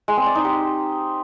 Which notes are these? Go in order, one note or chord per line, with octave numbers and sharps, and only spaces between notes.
G#3
C4
D5
D#4
G4